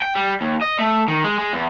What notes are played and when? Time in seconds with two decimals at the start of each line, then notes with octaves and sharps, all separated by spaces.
0.02 G5
0.16 G3
0.41 D#2
0.61 D#5
0.79 A3
1.08 D#3
1.24 G#3
1.39 G#3
1.53 E2